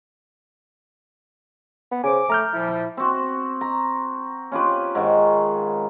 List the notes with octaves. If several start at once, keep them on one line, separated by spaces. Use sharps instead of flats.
B3
C#3 C5 G#5 D6
A3 A#5 F6 G6
A#2 F3 G3 E4
C4 F#4
A#5
C#4 F4 G4 B4
G#2 D#3